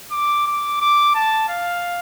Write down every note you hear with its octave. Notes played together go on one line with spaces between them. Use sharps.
D6
D6
D6
A5
F5